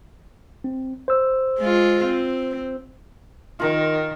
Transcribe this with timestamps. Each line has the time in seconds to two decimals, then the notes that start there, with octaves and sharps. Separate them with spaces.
0.64 C4
1.08 C5 E6
1.60 G#3 F4
2.04 C4
3.60 D#3 F4 A#4